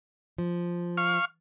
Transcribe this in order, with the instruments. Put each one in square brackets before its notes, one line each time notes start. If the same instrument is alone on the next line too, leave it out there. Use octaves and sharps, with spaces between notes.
[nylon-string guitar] F3
[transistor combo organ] F5 C#6 F6